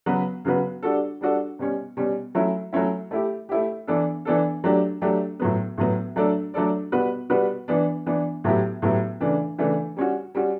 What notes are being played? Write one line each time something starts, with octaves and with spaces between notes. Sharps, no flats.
C#3 F#3 B3 F#4 B4
C#3 F#3 B3 F#4 B4
G3 D4 F#4 A4
G3 D4 F#4 A4
B2 G3 C#4
B2 G3 C#4
F#3 A3 C#4 E4
F#3 A3 C#4 E4
A3 E4 G4
A3 E4 G4
E3 B3 D4 A4
E3 B3 D4 A4
F#3 A3 D4 G4
F#3 A3 D4 G4
A2 F#3 B3
A2 F#3 B3
F#3 A3 D4 A4 D5
F#3 A3 D4 A4 D5
B2 G3 B3 F#4 B4
B2 G3 B3 F#4 B4
E3 B3 D4
E3 B3 D4
A2 F#3 B3 E4 G4
A2 F#3 B3 E4 G4
C#3 E3 A3 D4
C#3 E3 A3 D4
G3 C#4 F#4
G3 C#4 F#4